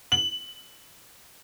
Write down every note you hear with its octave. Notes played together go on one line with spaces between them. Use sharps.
F#7